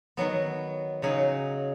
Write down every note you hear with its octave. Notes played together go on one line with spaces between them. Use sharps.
D#3 F#3 B3
C#3 F#3 D#4 G#4